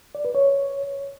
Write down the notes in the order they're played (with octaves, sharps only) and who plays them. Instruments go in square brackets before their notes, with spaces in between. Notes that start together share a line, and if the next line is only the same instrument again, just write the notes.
[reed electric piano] D5
B4
C#5